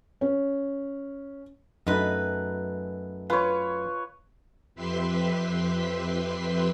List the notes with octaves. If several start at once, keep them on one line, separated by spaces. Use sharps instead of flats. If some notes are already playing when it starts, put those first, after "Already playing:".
C#4
F#2 A3 D#4 B4
F4 B4 C#5
F2 G4 B4 E5 C6 B6